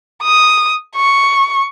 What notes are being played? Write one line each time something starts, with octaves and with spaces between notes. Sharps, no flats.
D#6
C#6